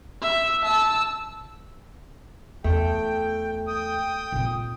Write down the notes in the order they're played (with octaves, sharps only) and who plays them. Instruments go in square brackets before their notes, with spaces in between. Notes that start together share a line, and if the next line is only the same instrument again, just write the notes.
[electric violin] E5
A5 E6
[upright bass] E2 [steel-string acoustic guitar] A3 [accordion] G5
[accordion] G5 D#6
[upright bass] A#2 C4